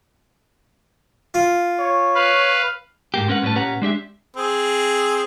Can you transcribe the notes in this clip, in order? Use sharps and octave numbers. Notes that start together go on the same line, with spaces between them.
F4
C#5
B4 F5
G#2 A#3 G4
G#3 C#4 A#4 B4 F#5
A2 G3 C#4 B4 A5
A#2 C#4 G4 B4 F#5 A#5
G#3 D4 G4 E5
C4 G#4